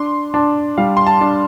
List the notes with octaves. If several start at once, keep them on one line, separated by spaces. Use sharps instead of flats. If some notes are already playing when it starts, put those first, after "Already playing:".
Already playing: D4 C6
D4 A5
G3 F5
C6
A5
D4